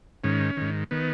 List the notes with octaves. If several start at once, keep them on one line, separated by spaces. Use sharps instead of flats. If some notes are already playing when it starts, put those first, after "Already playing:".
G#2 D#3 C#4
G#2 D#3
D#3 B3